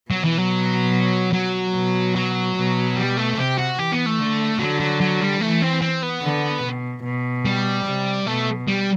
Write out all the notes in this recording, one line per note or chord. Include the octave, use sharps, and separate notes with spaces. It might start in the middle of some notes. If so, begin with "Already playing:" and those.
B2 F#3
E3
F#3
F#3
B2
F#3
B2
G3
A3
C3 G4
F#4
E3 G4
B3
A3
D3
D3 F#3
F#3
F#3
G3
E3 A3
C4
C4
B3
D3
B2
B2
G3
C3
B2 A3
G3